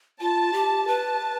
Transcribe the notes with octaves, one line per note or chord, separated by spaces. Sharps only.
F4 A5
G4
B4 A5